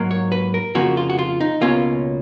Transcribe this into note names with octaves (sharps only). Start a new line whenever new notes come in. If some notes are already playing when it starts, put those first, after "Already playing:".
Already playing: G#2 F#3 A#3
C#5
B4
A#4
F2 C#3 F3 A#3 F#4
F4
F#4
F4
D#4
C#2 B2 A#3 C#4 F4